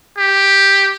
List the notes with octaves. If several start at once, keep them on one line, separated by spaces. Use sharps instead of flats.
G4